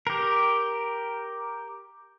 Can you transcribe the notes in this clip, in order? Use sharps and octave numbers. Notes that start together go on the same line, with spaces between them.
G4 A#4